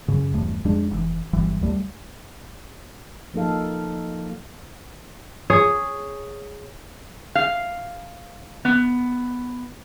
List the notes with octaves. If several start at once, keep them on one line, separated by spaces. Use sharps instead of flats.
F#2 C#3
D1 E2 G2 A3
F2 G#3 D4
F1 C#3 E3
G1 E3 G3
D#2 G3 A3
F3 A#3 D#4 A4 F5
G#4 C#5
F5
B3